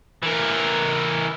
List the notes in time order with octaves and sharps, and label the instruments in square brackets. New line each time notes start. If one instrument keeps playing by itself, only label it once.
[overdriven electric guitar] E3 A#4